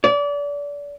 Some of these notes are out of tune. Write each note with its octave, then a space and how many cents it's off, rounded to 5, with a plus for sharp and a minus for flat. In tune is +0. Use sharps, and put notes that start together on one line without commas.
D5 -30